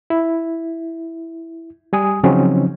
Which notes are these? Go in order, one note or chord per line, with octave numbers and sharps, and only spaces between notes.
E4
G3 G#5 D#6
C#3 F3 F#3 C4 C#4 D#4